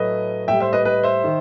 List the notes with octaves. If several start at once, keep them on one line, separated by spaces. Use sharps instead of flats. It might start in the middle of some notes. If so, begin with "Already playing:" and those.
Already playing: A2 F#3 A3 B4 D#5
A2 G3 E5 G5
C5 E5
B4 D#5
B4 D#5
C5 E5
D#3